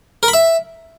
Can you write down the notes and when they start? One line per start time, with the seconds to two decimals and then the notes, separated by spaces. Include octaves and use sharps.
0.23 A#4
0.28 B5
0.34 E5